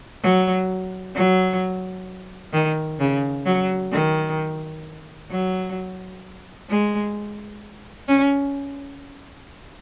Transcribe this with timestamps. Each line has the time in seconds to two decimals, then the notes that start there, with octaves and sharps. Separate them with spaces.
0.23 F#3
1.15 F#3
2.53 D#3
2.99 C#3
3.46 F#3
3.92 D#3
5.31 F#3
6.70 G#3
8.08 C#4